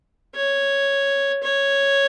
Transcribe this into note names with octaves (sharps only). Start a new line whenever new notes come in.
C#5
C#5